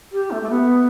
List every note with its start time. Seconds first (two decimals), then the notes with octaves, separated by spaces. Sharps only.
0.12 G4
0.30 A3
0.41 A3
0.49 B3